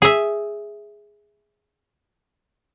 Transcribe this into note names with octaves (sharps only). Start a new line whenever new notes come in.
G#4 E5